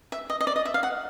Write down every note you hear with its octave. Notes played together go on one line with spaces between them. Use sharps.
E5
D#5
D#5
D5
D#5
E5
F5
F#5